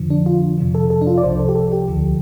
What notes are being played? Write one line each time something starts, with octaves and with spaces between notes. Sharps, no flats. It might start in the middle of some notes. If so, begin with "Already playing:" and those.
Already playing: F2 D3 F3
D4
F4
F2 C3 F3
A4
A4
D4
F4
D5
C2 C3 F3 C5
A4
G4
A4
G4
D2 D3 F3